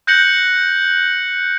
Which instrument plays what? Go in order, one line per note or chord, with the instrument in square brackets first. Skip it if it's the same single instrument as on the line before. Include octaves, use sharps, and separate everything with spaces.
[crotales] F#6 G6 A#6 C#7 F#7